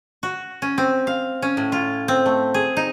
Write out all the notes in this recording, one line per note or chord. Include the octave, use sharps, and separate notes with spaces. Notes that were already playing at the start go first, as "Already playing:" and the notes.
F#4
C#4
C4
F5
C#4
A2
F4
C4
A3
G#4
D#4